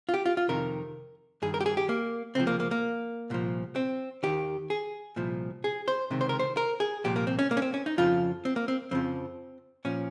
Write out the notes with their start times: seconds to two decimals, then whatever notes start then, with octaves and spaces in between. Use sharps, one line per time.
0.09 F4
0.14 G4
0.26 F4
0.37 F4
0.48 F2 C3 D#3 A#4
1.42 G2 D#3 G#4
1.54 A#4
1.61 G4
1.66 G#4
1.77 G4
1.89 A#3
2.35 C#2 C3 F3 C4
2.47 A#3
2.60 A#3
2.71 A#3
3.30 C2 A#2 F3
3.76 C4
4.23 D#2 D#3 G4
4.70 G#4
5.16 C2 A#2 F3
5.64 G#4
5.88 C5
6.10 C#2 C3 D#3
6.21 C5
6.29 A#4
6.39 C5
6.57 A#4
6.80 G#4
7.04 C2 A#2 F3 G4
7.16 A#3
7.27 C4
7.39 C#4
7.51 A#3
7.57 C#4
7.62 C4
7.74 C#4
7.86 D#4
7.98 F2 C#3 F3 F4
8.45 C4
8.56 A#3
8.68 C4
8.91 F2 C#3 F3 C4
9.85 A#2 F3 C#4